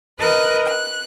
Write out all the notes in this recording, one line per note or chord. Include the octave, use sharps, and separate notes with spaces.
A#4 B4 D#5 F#6
F#6